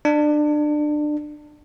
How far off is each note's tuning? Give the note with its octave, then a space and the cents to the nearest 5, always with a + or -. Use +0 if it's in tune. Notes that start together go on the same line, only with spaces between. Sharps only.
D4 +25